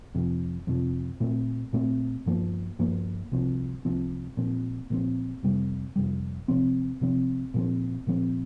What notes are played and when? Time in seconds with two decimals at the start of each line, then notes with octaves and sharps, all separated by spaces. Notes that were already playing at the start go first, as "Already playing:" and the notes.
0.15 F2 C3 F3
0.67 F2 C3 F3
1.20 A#2 A3 C4
1.73 A#2 A3 C4
2.26 G2 F3 A#3
2.79 G2 F3 A#3
3.32 C2 C3 F3 C4
3.85 C2 C3 F3 C4
4.37 A#2 F3 C4
4.90 A#2 F3 C4
5.43 F2 C3 G3
5.96 F2 C3 G3
6.48 C3 F3 C4
7.01 C3 F3 C4
7.54 A#2 F3 C4
8.07 A#2 F3 C4